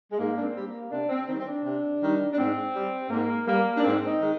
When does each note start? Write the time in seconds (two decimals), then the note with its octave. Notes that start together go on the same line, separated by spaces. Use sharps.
0.11 G#3
0.19 G#2 A#3
0.36 D4
0.43 C4
0.55 G3
0.66 A#3
0.91 C3 D4
1.09 C4
1.28 D#3 G3 C4
1.39 C4
1.47 D4
1.64 C3
2.01 D#3 G3
2.32 D4
2.38 G#2 C4
2.74 G3
3.10 G#2 A#3
3.46 G3 A#3
3.77 D4
3.83 G#2 C4
4.07 D#4
4.20 D#3 G#3